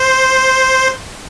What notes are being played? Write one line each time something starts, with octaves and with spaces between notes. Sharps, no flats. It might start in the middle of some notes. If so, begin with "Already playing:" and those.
Already playing: C5